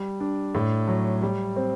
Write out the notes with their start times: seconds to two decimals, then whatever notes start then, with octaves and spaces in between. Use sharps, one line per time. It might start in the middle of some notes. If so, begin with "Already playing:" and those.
Already playing: G3
0.20 D4
0.55 A2
0.88 F#3
1.22 G3
1.56 C4